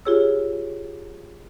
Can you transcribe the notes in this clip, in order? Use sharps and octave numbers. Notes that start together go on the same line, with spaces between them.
F4 G4 G#4 C#5 E6